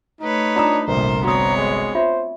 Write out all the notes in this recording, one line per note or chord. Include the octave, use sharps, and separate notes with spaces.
A3 D#4 B4 C#5
D4 F4 A#5 D#6
G1 C2 A#2 A#4 C5
B3 C4 F#4 C#5 A#5 D#6
G#3
F4 C5 E5